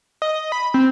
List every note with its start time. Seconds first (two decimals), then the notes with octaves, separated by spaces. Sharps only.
0.22 D#5
0.52 B5
0.74 C4